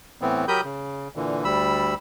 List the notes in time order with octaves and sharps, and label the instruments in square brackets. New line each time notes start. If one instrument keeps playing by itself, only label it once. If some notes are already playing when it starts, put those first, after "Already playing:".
[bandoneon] A2 E3 B3 C4
F#3 G4 A#4 B5 D#6 G6
C#3
A#2 D3 E3
D2 G3 B5 E6